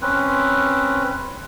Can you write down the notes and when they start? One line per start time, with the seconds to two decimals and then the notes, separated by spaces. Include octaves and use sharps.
0.02 C4 C#4 B4